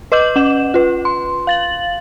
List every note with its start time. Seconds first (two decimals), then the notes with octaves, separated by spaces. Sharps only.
0.12 B4 D#5 D6 G6 F#7
0.36 C#4 F#5 E7
0.74 F4 B4
1.05 C6
1.47 F5 A6 F#7